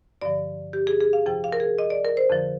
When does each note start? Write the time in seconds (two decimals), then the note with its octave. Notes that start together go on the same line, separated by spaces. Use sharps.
0.21 G2 D3 F3 D5
0.73 G4
0.87 G#4
1.01 G#4
1.13 F5
1.26 F2 C3 F3 G5
1.44 F5
1.52 A#4
1.60 G#4
1.78 D#5
1.90 D5
2.05 A#4
2.17 C5
2.30 F2 D3 F3